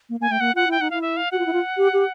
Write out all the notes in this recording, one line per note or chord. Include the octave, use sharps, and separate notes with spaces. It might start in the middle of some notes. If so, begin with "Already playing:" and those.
A#3
A#3 G#5
A3 G5
A#3 F#5
F4 F#5
E4 G5
D#4 F#5
E4 F5
E5
F5
F#4 F#5
F4
E4
F4
G4
G4